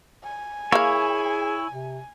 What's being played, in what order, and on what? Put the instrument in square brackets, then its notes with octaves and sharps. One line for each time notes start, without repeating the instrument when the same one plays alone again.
[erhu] G#5
[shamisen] A#3 F5 [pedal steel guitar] E4 C#5 [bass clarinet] G#4
[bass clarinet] C3